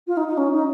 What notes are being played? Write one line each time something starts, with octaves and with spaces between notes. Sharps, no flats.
F4
D#4
D#4
C#4
D#4